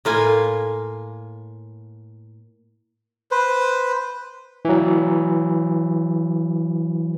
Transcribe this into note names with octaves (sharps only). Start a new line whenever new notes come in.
A2 A#3 F4 G#5
B4 C5
E3 F#3